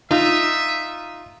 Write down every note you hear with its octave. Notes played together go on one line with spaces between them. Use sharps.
D#4 F4 E5